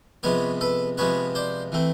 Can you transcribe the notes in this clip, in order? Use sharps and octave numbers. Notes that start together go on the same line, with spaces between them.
C3 F3 G#3 B3 B4 C#5
A4 B4
C3 F3 G#3 B3 B4 C#5
C5 D5
E3 A3 C4